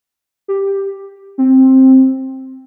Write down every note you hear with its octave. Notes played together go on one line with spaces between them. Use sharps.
G4
C4